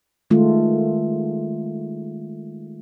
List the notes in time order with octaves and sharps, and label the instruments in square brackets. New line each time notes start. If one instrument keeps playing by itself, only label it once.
[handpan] D#3 G#3 A3 F4